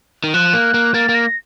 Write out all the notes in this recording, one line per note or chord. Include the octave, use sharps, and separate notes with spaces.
D#3
F3 F#6
A#3
A#3
A#3 A6
A#3
A#6